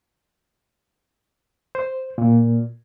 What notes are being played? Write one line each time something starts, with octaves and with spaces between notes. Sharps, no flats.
C5
A#2